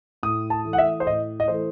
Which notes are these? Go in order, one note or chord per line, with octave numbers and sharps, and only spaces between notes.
A2 D#6
A5
E3 A3
F#5
E5
C5
A2 D#5
D#5
E3 A3 C5